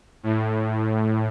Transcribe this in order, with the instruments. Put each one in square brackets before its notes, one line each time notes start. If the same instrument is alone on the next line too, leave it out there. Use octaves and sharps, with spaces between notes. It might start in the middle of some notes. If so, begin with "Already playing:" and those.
[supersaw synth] A2